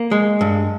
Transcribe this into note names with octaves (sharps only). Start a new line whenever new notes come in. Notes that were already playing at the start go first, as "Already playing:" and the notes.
Already playing: A#3
G#3
G2